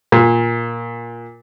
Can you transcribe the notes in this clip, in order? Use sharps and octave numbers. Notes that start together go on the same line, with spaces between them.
A#2